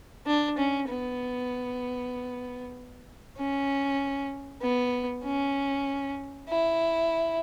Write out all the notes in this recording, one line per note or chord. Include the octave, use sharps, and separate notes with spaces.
D4
C#4
B3
C#4
B3
C#4
E4